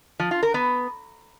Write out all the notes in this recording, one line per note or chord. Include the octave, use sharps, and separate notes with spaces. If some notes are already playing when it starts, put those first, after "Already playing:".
F3
F4
A#4
B3